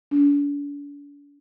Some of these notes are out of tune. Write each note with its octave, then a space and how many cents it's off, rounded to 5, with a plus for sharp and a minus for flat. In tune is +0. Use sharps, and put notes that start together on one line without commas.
D4 -40